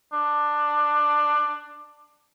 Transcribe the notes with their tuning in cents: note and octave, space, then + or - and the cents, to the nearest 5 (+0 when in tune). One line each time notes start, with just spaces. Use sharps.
D4 +15